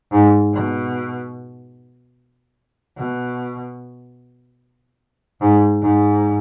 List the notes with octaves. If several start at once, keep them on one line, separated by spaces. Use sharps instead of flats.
G#2
B2
B2
G#2
G#2